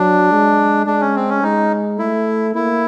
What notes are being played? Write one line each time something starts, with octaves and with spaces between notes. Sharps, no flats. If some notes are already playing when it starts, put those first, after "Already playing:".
Already playing: F#3 D4
G#3
G#3 D4
C#4
C4
C#4
G#3 D#4
A3 E4
A#3 E4